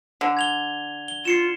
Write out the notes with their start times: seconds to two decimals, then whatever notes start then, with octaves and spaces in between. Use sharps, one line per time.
0.21 D3
0.37 G#6 F7 G7
1.08 G7
1.25 F4 C7 C#7 E7